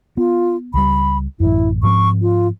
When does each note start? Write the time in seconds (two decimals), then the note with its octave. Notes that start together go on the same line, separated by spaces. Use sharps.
0.17 B3 F4
0.74 C#2 G3 B5
1.40 A1 F#2 E4
1.83 G#2 F3 C4 C#6
2.22 F4